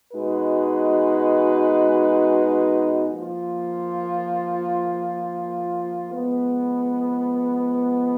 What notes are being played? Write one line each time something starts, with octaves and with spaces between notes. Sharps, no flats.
B2 G#3 D#4 F#4 B4
F3 A#3 F4
F3 G#3 B3